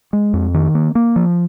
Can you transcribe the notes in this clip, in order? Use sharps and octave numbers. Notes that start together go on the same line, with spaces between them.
G#3
F2
D#3
A#3
A#3
F3